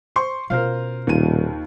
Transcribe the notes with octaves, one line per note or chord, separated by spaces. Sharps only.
C5 C6 C#6
B2 C#4 F4 A#4 C5 F5
D#1 D#2 F4 D#7